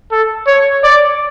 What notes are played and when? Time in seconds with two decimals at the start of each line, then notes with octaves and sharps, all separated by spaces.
0.12 A4
0.47 C#5
0.84 D5